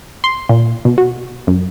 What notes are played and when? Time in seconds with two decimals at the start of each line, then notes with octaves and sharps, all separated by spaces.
0.24 C6
0.49 A#2
0.85 B2
0.98 F#4
1.47 F#2